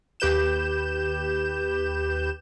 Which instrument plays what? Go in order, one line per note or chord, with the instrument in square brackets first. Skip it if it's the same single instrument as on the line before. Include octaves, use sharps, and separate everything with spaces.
[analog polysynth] D#2 G4 B4 G6 E7